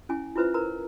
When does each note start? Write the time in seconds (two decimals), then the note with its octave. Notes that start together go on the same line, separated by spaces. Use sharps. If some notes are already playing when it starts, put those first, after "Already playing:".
0.09 C#4 E4 G#5
0.36 E4 F4 B4 C5 E5
0.54 A#4 B4 A#5